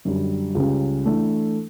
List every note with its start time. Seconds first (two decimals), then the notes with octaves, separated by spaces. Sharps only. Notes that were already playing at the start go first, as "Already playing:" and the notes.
0.05 F#2 D3 G3
0.55 C#2 C#3 G3 C#4 G4
1.06 E3 A3 D4 A4